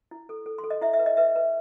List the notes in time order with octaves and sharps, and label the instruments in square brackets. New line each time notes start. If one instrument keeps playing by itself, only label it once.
[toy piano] E4
A4
A4
C6
A4
D#5
E4 E5
E5
B4
D#5
B4 E5
B4